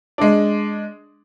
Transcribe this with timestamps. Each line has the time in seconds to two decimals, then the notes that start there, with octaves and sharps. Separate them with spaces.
0.18 G#3 D4